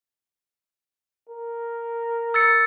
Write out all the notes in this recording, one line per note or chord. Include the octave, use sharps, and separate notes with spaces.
A#4
E6 A6 C#7